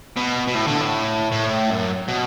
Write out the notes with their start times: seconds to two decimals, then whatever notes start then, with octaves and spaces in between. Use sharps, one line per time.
0.17 B2
0.47 B2
0.54 A2
0.67 D3
0.81 A2
1.32 A2
1.71 F#2
2.09 B2